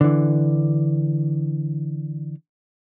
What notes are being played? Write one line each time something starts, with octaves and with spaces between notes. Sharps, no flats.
D3 E3